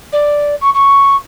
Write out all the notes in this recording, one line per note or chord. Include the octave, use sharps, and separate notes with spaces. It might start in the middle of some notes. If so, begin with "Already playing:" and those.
D5
C#6
C#6